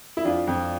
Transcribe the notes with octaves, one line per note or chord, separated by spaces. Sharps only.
E4
F2 D4 F4
F2